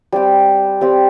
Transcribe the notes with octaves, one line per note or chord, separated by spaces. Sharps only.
G3 C4 G4
G3 C4 G4